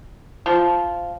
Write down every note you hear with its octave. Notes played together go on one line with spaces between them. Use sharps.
F3